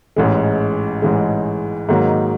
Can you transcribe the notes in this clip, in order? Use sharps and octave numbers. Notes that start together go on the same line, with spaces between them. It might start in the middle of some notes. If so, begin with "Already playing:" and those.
A1 G#2 E3 G#3
A1 G#2 E3 G#3
G#2 D#3 F#3 A#3